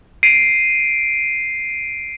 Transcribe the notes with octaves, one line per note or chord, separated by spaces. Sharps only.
C7 D7 D#7